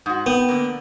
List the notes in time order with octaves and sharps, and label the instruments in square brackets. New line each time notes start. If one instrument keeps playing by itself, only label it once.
[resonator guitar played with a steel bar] G#2 F#4
[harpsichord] B3 [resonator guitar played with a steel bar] G5
[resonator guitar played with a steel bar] D3 A#3